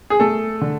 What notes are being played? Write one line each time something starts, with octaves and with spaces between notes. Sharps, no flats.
G#4
A3 A4
D3